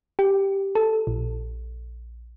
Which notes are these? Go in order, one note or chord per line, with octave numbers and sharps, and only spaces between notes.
G4
A4
A#1